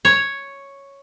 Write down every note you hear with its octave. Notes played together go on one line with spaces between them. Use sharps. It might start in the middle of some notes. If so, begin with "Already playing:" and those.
C#5